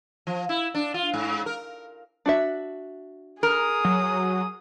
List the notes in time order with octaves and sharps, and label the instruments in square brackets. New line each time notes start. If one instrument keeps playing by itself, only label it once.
[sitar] F3
E4
D4
F4
G#2
A#4
[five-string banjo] D4 F#4 E5
[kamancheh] G#4 D#6 [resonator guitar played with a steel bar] A#4
[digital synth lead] F#3